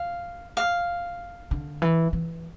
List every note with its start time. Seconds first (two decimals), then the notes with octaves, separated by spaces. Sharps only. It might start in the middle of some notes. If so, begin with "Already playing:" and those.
Already playing: F5
0.57 F5
1.51 D3
1.82 E3
2.13 E3